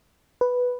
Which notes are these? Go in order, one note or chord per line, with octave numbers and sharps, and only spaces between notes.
B4